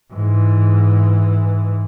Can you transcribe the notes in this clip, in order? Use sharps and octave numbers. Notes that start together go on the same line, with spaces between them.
G#2 E3